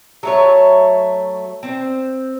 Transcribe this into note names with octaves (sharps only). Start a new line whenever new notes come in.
F#3 A3 C#5
C4 C5